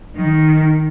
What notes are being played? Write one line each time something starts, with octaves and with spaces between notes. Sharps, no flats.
D#3